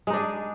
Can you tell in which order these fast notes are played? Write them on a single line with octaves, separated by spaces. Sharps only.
G#3 D#4 D4 G#4